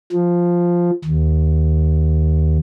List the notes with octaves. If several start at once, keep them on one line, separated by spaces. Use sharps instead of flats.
F3
D#2